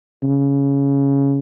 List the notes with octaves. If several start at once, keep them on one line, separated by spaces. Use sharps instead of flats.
C#3